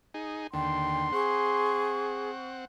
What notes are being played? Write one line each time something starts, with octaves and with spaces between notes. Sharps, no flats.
D#4 G#4
D#2 D3 G5 C6
C4 G#4 F#5 C#6